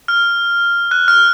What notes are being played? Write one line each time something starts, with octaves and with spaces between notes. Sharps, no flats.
F6
F#6
F6